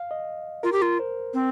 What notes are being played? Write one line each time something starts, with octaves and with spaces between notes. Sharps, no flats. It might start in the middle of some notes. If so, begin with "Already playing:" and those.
Already playing: F5
D#5
F4 A#4
G4
F4 A#4
C5
C4